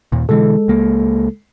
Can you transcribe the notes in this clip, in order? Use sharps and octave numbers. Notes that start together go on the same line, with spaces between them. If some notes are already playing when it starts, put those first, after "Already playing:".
D#2 A#2
B2 D3 E3 G#3 A4
C#2 A#3